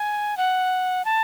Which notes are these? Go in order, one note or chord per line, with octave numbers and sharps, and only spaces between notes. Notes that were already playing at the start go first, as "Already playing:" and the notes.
Already playing: G#5
F#5
A5